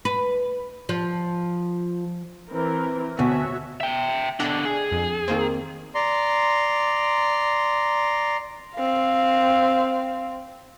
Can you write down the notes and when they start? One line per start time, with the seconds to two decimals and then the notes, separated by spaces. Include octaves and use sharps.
0.05 B4
0.89 F3
2.50 E3 C4 A#4
3.19 D2 B2 F#4 C#5 E5
3.80 E5 G5
4.40 B2 D3 D4
4.65 G#4
4.92 F2
5.28 D#3 A#3 C4
5.95 D5 A#5 C6
8.75 C4 F5